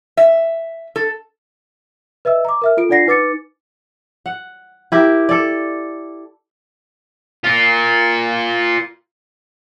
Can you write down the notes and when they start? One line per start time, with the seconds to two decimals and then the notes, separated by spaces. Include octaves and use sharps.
0.17 E5
0.96 A4
2.25 B4 D#5 E5 E6
2.45 A#5 D6
2.62 A#4 E5 F6
2.77 F4 A4 D7
2.89 D4 F4 D5 F#5 A#6 C7
3.07 D#4 B4 D6 A6 C#7
4.26 F#5
4.92 E4 G4 A#4
5.29 A4 D5
7.44 F4 A#4